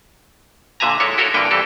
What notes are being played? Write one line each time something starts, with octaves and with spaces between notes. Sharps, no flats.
A#2 D3 E5 G#5 A#5
G#3 E4 A4 C#5
E4 F#4 A4 A#4 C#5
G2 D3 E3 A#3 B4 G5
G2 E3 C4 G4 A4